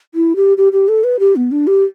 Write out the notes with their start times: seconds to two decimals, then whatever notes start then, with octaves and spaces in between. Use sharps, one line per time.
0.15 E4
0.36 G4
0.58 G4
0.73 G4
0.88 A4
1.04 B4
1.19 G4
1.36 B3
1.51 D4
1.67 G4